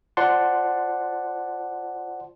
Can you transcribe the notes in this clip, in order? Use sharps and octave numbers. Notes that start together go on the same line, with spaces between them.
F4 C5 D5 F#5 A5 C6